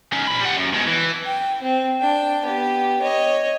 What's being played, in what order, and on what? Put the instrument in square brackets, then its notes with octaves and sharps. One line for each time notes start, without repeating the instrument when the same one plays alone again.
[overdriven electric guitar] C#4 D#4
A#2 B5
G3 F#5
F#2
B2 G#3
E3
[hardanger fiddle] G5
C4
D4 G5
B3 G4
C#5 D#5